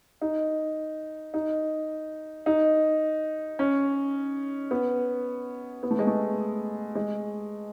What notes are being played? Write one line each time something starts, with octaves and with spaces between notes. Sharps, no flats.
D#4
D#4
D#4
C#4
B3
B3
A3
G#3
A3
G#3